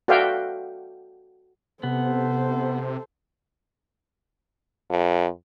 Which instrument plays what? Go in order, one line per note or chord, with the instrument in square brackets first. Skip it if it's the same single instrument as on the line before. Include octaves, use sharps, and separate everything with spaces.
[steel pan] F#4 A4 D5 E5 F5 G5
[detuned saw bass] C3 [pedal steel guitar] B3 [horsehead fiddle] A4 C5
[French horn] F2